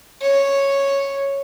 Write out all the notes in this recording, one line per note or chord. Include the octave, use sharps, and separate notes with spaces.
C#5